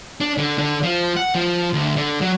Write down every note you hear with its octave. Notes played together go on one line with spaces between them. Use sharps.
D4
D3
D3
F3
F#5
F3
D2
D3
F#3